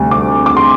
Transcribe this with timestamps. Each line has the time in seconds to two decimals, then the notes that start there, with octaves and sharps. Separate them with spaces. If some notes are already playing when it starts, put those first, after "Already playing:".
Already playing: D2 C3 G3
0.11 D6
0.46 D6
0.57 C6